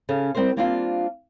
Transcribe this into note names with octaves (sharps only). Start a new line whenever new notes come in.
C#3 C#4 A4
G3 C4 E4 A#4 C5
G3 A#3 C4 D4 D#4 F4